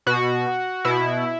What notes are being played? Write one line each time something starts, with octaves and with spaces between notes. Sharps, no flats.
B2 F#4
B2 E4